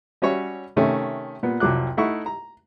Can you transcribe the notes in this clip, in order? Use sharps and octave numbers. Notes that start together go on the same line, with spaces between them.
G3 C#4 F#4 C#5 E5
C3 D#3 A3 C#4
A#2 B3
C2 F2 F#3 D6 F#6
A3 D#4 E4 F#5 C#6
A#5